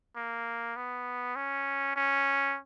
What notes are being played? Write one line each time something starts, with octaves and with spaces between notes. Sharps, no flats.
A#3
B3
C#4
C#4